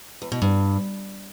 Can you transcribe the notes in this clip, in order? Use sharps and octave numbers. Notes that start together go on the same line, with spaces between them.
E2
B2
G2